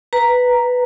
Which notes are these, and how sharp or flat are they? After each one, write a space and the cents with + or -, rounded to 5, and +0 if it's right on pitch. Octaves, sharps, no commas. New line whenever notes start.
B4 +0 A#5 +0